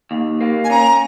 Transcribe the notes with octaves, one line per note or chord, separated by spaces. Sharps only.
D#2
A#3
G#5
C#4 A#5